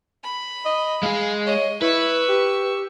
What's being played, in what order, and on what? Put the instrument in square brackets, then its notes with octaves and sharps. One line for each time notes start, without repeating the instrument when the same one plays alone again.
[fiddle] B5
[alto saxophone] D#5
[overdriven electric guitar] G#3 G#4 [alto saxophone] F5
[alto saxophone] C#5 [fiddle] D#5
[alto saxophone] E4 [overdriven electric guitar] B4 [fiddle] C#6 E6
[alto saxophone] G4